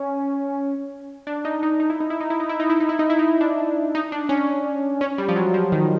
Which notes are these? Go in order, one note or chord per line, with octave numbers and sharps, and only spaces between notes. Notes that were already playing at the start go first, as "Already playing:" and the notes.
Already playing: C#4
D4
D#4
D#4
D#4
E4
D#4
E4
D#4
E4
D#4
E4
D#4
E4
D#4
E4
D#4
E4
D#4
D4
D#4
D4
C#4
C#4
G3
F3
F#3
F3
D#3